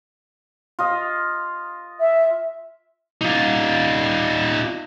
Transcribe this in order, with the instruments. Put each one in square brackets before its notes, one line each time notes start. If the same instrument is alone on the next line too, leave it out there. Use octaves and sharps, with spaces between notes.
[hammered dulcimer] F4 D#5
[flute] E5
[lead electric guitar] D#4 F4